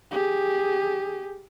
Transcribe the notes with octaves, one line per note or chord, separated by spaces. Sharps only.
G4 G#4